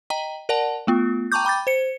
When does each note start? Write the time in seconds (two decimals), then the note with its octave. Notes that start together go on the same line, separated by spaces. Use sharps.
0.10 D#5 G5 A#5
0.49 A#4 D5 F#5 A5
0.87 A3 B3 F4
1.32 G5 A5 A#5 C#6 D6 G6
1.45 G5 B5 D6 G6 A6
1.67 C5 C#7